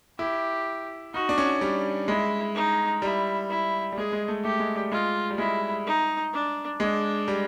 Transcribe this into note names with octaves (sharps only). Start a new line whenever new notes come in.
E4 G4
D#4 F#4
D4
C#4
G3
G#3 E4
D#4
G3 E4
E4
G3
G#3 G#4
G#3
A3
A3 G4
G#3
G3
G#3 F4
G3
G#3 E4
D#4
D4
G#3 D4
G3